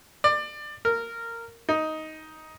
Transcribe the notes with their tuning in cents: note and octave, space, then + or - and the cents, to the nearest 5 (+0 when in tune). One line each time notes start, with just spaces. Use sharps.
D5 +25
A#4 -15
D#4 +10